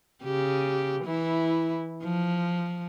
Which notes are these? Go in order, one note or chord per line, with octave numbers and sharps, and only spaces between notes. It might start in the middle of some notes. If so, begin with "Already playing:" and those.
C#3 G4
E3 E4
F3